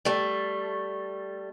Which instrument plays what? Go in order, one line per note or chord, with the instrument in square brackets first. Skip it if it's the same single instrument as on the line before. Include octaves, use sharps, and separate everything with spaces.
[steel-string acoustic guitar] G3 A3